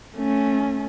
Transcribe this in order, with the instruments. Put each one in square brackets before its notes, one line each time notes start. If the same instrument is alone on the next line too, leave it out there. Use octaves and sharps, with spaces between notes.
[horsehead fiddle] A3 C#4